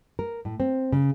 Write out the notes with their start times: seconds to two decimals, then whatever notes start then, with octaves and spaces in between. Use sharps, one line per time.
0.19 A#4
0.45 A2
0.60 C4
0.92 C#3